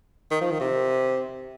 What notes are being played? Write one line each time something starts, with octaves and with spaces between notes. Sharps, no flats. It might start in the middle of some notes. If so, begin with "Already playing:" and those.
D#3
F3
D#3
C3